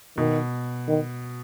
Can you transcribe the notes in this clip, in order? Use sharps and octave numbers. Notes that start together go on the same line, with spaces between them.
B2 D#3
D#3